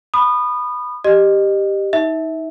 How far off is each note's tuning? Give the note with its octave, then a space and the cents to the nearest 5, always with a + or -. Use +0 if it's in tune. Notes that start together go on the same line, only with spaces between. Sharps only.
B5 +0 D#6 -30
G4 +0 D#5 -25
D#4 +30 E5 -20